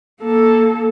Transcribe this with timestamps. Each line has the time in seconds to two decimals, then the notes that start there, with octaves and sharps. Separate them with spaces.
0.21 A#3 A4